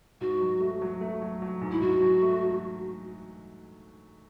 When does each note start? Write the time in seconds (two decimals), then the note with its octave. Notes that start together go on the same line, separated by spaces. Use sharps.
0.21 G#2 F#4
0.41 F#3
0.60 A3
0.82 F#3
1.01 A3
1.22 F#3
1.42 F#3
1.61 G#2
1.71 E4
1.81 G#2 F#4
2.02 F#3
2.22 A3